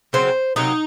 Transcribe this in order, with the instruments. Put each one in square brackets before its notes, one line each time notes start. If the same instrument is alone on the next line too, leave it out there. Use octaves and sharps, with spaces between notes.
[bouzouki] C#3 F#3 C4 C5
C3 F#3 A#3 D#4